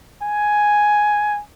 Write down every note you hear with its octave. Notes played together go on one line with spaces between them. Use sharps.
G#5